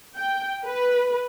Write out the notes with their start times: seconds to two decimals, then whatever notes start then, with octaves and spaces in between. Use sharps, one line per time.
0.17 G5
0.65 B4